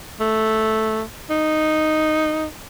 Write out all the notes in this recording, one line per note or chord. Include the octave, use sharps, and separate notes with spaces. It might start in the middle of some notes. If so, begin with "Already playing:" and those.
A3
D#4